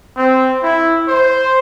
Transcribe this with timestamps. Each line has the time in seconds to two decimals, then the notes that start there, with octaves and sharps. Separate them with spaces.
0.17 C4
0.63 E4
1.09 C5